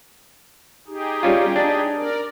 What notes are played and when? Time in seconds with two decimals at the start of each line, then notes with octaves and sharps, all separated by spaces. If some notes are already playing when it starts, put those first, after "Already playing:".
0.87 D#4 G4 G#4
1.23 G3 C#4 F4
1.56 D4
1.95 A#4 D5